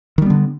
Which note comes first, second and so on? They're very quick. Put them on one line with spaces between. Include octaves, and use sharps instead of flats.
D#3 G3 B3 D3